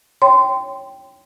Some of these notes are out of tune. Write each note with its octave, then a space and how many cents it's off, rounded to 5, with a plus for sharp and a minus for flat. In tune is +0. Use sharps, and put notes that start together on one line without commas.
C#5 +0 G5 +0 C6 -25